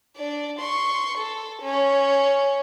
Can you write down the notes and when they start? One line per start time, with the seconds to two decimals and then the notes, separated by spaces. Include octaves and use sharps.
0.17 D4 D5
0.59 C6 C#6
1.17 A4
1.62 C#4